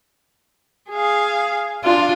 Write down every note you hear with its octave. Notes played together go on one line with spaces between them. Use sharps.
G#4 F5
D4 F4